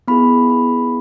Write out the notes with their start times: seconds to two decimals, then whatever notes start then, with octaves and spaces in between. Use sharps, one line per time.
0.08 B3 E4 G#4 B5
0.50 B5